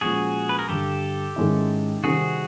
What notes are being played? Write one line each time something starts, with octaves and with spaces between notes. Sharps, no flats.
A#2 F3 G#3 C#4 F#4 G#4
B4
A#4
G2 D3 G3 G4 A4
G#2 D#3 G#3 C#4 E4
C3 D#3 G3 C4 F#4 G#4